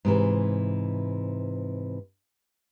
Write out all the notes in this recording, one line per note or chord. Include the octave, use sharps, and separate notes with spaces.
G#2 C3 E3